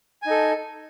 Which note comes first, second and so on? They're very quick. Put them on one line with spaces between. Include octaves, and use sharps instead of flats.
G#5 D#4 A4